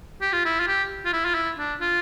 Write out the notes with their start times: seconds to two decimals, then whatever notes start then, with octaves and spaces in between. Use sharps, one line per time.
0.21 G4
0.33 F4
0.45 E4
0.60 F4
0.68 G4
1.05 F4
1.13 E4
1.25 F4
1.35 E4
1.58 D4
1.80 F4